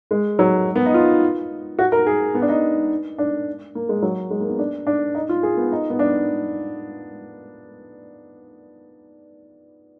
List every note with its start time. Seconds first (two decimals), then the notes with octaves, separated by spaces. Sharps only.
0.11 G#3
0.39 F#3
0.76 B3
0.86 D#4
0.94 F4
1.79 F#4
1.92 A#4
2.07 G#4
2.35 B3
2.42 D4
2.49 D#4
3.18 D4
3.75 A#3
3.89 G#3
4.02 F#3
4.31 G#3
4.40 A#3
4.49 B3
4.59 D4
4.87 D4
5.15 D#4
5.29 F4
5.43 G#4
5.57 B3
5.72 D#4
5.90 B3
5.99 D4